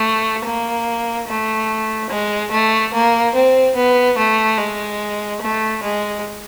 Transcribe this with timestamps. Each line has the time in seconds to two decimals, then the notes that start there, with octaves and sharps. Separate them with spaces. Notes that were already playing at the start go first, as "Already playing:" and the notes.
Already playing: A3
0.45 A#3
1.28 A3
2.10 G#3
2.51 A3
2.94 A#3
3.35 C4
3.76 B3
4.18 A3
4.58 G#3
5.41 A3
5.83 G#3